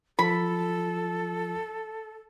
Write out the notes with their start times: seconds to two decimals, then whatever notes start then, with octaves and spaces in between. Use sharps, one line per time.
0.19 F3 F4 A4 B5